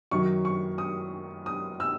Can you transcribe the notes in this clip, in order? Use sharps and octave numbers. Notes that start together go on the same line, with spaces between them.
F#2 D#3 F#3 C#6
C#6
D#6
D#6
E6